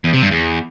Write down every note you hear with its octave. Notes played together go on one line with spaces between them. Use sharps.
E2
C3
G2
E2